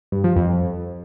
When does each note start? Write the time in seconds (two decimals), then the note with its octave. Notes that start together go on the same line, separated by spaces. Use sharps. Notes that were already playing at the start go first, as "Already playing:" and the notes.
0.12 G2
0.24 F3
0.36 F2